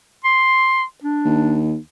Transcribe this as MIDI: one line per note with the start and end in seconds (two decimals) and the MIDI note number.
0.24 0.83 84
1.04 1.62 62
1.25 1.75 39